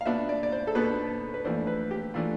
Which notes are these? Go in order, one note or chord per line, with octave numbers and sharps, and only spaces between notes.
F5
B2 B3 D4 E5
D5
D5
C5
A4
B2 B3 D4 B4
B4
F2 E3 A3 D4 C5
B4
G4
E3 A3 D4 F4